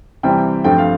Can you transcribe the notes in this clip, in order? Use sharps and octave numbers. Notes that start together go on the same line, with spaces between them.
C3 E3 G3 C4 G5
G2 F3 A3 C4 G5
F5